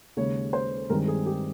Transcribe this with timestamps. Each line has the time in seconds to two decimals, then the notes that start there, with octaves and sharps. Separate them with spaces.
0.17 D#2 C#3 G#3 C#5
0.53 C5
0.90 G2 D#3 G#3 C4 A#4
1.08 G#4
1.26 G4